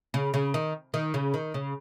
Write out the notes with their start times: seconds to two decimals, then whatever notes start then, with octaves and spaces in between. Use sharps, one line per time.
0.14 C#3
0.34 C#3
0.54 D#3
0.94 D#3
1.14 C#3
1.34 D#3
1.54 C#3